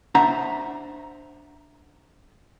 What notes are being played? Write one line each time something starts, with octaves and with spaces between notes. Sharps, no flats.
D4 C5 E5 F#5 A#5